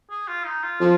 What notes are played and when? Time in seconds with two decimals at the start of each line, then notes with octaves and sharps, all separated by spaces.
0.10 G#4
0.28 F4
0.45 D#4
0.63 F4
0.81 F3